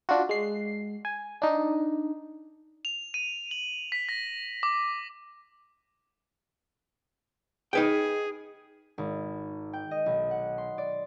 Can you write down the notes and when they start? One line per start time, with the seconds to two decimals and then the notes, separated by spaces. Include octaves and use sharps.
0.09 D4 F4 F#4
0.29 G#3 C7
1.05 G#5
1.42 D4 D#4
2.85 F7
3.14 D#7
3.51 F#7
3.92 B6
4.09 A#6
4.63 D6
7.73 D#4 G#4 B4 G5
8.98 G#1
9.73 G5
9.91 D#5
10.06 B1
10.31 F#5
10.58 C6
10.78 D5